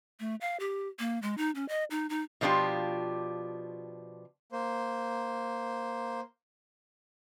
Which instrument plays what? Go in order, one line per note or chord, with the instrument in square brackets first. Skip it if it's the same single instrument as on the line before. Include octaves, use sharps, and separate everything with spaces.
[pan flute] A3
F5
G4
A#3
G#3
D#4
C#4
D#5
D#4
D#4
[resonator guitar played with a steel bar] B2 F3 D4 F4 G4
[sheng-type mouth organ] A#3 C5